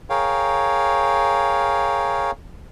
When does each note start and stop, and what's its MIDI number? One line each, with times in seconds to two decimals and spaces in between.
0.10 2.31 68
0.10 2.31 70
0.10 2.31 73
0.10 2.31 77
0.10 2.31 79